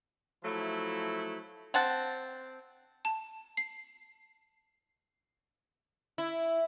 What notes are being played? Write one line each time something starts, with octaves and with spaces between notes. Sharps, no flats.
F3 F#3 A3 E4
C4 F#5 A5
A5
C7
E4